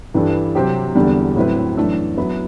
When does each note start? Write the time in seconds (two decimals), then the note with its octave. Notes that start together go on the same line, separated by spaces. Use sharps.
0.14 G2 E3 G3 D4 A4
0.55 C3 F#3 C4 G4 C5
0.95 E2 D3 G3
1.36 A2 F#3 C4 E4 B4
1.77 F#2 E3 A3 D4 A4
2.18 F#3 B3 E4 B4